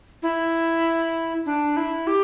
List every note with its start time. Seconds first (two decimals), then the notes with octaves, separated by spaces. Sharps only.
0.22 E4
1.46 D4
1.77 E4
2.07 G4